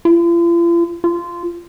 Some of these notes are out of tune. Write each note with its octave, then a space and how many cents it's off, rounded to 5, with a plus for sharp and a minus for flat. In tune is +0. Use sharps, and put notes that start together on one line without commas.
F4 -45
F4 -15